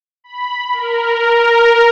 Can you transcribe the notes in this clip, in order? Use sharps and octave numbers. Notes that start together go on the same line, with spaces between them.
B5
A#4